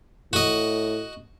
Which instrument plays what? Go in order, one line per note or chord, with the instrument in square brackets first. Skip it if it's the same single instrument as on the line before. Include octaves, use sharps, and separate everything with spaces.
[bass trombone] A2 [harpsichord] F#4 D#5